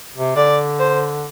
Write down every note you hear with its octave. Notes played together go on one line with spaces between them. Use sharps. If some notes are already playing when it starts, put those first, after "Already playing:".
C3
D3 D5
C5